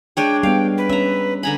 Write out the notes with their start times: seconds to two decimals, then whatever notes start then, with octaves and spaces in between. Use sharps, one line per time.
0.17 G#3 D4 C#5 G5
0.43 G3 B3 F5 G5
0.78 B4
0.89 C#4 E5 A#5
1.43 D3 G#5 A#5 B5